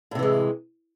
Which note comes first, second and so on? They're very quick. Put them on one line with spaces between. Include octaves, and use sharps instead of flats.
A2 C3 E3 G#3